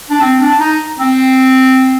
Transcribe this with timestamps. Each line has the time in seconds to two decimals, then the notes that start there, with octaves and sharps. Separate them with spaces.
0.10 D4
0.21 C4
0.40 D4
0.60 D#4
0.99 C4